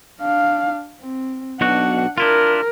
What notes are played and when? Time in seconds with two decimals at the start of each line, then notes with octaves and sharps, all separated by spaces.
0.21 D4 F5
1.00 C4
1.61 B1 B2 D4 F#4 F#5
2.18 D4 E4 F4 A#4